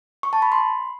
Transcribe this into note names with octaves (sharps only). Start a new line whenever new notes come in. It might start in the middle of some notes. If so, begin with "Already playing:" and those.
C#6
A5
B5
C6